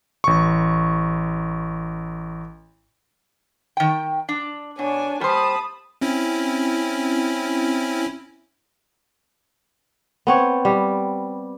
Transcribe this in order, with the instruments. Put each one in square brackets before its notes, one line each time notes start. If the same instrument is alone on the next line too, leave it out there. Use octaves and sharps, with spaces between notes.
[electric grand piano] A1 C#6
[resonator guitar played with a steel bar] D#3 G5
D4
[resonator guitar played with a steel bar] B2 [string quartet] D4 C#5 G#5
[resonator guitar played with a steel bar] G3 C5 [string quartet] A5 B5 D#6
[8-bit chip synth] C4 C#4 E4
[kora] B3 C4 C#5
G3